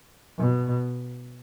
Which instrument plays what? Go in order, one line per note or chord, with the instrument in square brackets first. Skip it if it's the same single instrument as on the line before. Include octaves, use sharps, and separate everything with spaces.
[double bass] B2